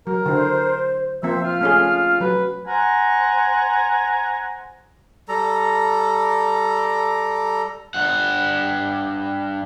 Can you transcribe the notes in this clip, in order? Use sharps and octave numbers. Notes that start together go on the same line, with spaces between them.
F#3 A#4
D3 E4 C5
F3 A#3 C4 C5 E5
F4 F6
A3 C#4 G#4
F#3 B4
C5 F#5 G#5 A#5
G3 A4 A#5
G2 F#5